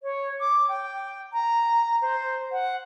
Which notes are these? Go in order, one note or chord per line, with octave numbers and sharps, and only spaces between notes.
C#5
D6
G5
A#5
C5
F#5